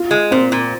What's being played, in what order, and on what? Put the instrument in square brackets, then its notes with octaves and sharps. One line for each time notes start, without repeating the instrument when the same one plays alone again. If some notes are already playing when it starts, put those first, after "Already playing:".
Already playing: [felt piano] F4
[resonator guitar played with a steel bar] G#3
[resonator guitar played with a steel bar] A#2 [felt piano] C4
[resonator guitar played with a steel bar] A#2